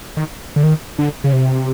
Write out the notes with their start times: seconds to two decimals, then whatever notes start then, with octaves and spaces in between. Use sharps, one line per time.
0.17 D#3
0.56 D3
0.63 D#3
0.98 D3
1.24 C#3
1.33 C3